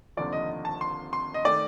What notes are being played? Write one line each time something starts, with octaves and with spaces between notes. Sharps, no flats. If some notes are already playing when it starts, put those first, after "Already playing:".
F1 D#2 D3 F3 D5
D#5
A5
C6
C6
D#5
D#3 A3 D5